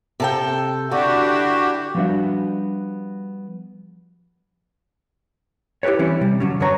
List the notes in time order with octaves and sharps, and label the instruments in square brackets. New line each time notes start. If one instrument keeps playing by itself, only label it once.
[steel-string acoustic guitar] C3 A4 G5
[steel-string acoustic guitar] D3 [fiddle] D4 E4 [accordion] F#4 G4
[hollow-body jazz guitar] F3 G3 B3 D4 F#4 E5
E4 G4 A#4 B4 C#5
E3 G3 C4 C#4 E4
C3 G3
D3 F#3 C#4
F#2 D3 D4 B4 C#5 A#5